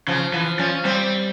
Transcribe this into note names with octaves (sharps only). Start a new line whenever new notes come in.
C#3 F3
E3 F3
F3 C#4
G3 C4